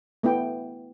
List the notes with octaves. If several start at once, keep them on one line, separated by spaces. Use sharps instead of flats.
A3 B3 E4 G5